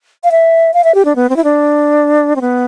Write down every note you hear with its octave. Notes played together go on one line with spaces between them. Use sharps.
F5
E5
F5
E5
G4
D4
B3
C4
E4
D4
C4
B3